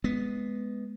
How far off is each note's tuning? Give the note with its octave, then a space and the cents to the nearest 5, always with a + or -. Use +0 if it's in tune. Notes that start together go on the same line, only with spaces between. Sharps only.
G#3 +15 B3 +0